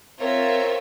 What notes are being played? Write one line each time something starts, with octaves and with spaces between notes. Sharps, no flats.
C4 F4 A#4 C#5 E5